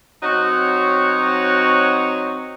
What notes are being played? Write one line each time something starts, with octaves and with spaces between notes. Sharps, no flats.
F#3 C4 D#4 F#4 C#5